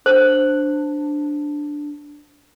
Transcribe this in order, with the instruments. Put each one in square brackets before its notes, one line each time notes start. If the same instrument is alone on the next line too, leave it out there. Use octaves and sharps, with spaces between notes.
[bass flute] D4 [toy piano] C5